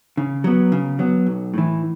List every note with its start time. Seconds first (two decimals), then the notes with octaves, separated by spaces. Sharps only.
0.17 C#3
0.44 F#3 B3
0.72 C#3
0.99 F#3 B3
1.26 B1
1.54 A2 E3